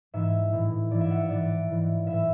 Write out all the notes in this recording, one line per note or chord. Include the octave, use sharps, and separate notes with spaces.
G#2 E3 E5
A2 E3
G#2 E3 D5
E5
F#5
E5
G#2 E3 D5
G#2 E3
A2 E5
E3